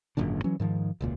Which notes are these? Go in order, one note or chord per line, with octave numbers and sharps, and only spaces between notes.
G#1 F#2 A#2 D3
E3 F#3 C#4
G#2 D#3 F3
E1 C#2 A#2